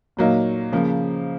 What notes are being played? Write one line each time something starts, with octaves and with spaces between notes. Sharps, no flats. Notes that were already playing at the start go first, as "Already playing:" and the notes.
A#2 F#3 A#3 D#4
C#3 F3 A#3